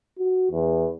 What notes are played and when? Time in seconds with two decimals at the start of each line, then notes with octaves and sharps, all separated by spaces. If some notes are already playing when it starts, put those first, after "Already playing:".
0.19 F#4
0.51 E2